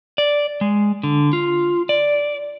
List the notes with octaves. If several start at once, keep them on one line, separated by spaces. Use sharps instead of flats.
D5
G#3
D3
F4
D5